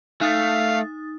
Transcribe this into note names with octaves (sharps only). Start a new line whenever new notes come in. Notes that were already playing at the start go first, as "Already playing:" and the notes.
A3 D#4 F5 D#6 A6